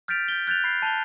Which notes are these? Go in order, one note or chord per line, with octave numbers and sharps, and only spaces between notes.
F6 G6 A6 B6 D7 F7
G6 G7
F#6 G6 A6 F7
B5 C7
A5 F7 G7